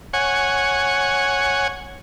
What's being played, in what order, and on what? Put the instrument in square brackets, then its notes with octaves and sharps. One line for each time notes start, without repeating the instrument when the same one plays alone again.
[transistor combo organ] C#5 F#5 G#5